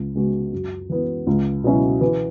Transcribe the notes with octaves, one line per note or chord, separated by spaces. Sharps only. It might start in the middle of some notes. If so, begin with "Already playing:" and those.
Already playing: C#2
C#3 G#3 B3 F#4
F#2
E3 B3
C#2
B2 F#3 C#4 E4
E3